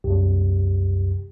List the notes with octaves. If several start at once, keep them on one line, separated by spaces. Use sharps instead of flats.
C2 F#2 G4